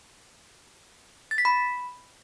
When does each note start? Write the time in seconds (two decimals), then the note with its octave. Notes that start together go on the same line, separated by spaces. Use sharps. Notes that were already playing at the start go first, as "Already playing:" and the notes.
1.31 A6
1.38 B6
1.45 B5